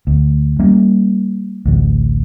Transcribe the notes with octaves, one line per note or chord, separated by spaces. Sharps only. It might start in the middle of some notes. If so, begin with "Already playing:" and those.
D2
G3 A#3 C#4
A1 D2